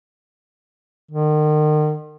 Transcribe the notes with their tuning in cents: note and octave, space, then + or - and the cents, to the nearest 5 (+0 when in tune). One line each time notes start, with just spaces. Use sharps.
D#3 -40